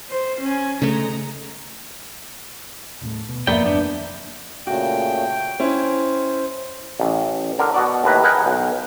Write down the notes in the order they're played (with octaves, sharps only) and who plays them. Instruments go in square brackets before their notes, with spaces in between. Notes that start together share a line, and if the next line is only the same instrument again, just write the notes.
[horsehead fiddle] C5
C#4 G#5
[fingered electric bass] C#3 A3 [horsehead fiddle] G#3 A#5
[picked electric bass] D#1 A2
B2
[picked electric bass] D#1 G#1 [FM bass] F2 [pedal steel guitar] A#3 B3 G5 [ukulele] D5 E5
[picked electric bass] G#1 F#2 [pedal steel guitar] B3 D4
[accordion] A#2 C#3 A3 [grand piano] F#4 [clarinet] G5
[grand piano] C#4 E4 [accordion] C5
[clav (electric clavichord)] A1
D3 A#4
B2 F#4 D5
D#2 A2 B4 A#5
G#4 A#4 B4 F#5 G5
B1